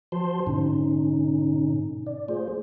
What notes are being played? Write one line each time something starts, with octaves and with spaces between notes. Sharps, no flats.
F3 F#4 C5 A5 C6
G#2 B2 D3 C#4 D#4
D5
A3 F4 G#4 C5